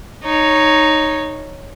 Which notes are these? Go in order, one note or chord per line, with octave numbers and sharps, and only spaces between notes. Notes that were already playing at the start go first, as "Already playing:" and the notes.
D#4 C#5